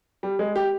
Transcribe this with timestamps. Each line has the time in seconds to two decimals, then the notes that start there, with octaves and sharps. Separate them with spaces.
0.23 G3
0.39 G#3
0.56 G4